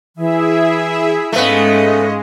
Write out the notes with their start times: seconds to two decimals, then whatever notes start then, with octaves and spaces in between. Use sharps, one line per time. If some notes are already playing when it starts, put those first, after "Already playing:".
0.16 E3 E4 G#4 E5
1.32 G#2 G#3 A3 B3 C#4 D#5 F5